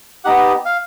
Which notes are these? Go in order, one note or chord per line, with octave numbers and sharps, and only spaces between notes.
B3 D#4 G4 F#5
F5